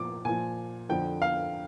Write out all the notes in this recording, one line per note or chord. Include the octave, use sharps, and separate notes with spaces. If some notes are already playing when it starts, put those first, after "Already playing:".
Already playing: A#2 F3 D6
A#2 F3 G#5
F2 D3 F3 G5
F5